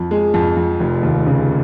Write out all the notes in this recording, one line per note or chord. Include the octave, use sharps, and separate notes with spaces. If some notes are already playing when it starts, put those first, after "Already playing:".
Already playing: F2
G#3
F2
F2
F1
D#2
C#3